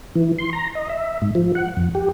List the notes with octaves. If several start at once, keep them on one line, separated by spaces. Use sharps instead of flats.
E3
C6
A#5
D#5
E5
G#2
F3
F#5
F2
G4